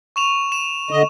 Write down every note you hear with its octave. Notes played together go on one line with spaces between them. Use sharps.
C#6 E7 F7
E7
D3 D#5